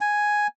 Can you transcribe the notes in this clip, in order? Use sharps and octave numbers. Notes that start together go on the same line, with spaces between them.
G#5